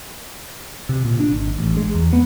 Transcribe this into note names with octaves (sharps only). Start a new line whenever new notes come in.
C3
A#2
D4
G#1
A1
G#3
E2
B3